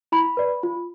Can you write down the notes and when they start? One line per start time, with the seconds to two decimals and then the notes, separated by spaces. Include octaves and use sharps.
0.12 E4 B5
0.37 B4 D5
0.63 F4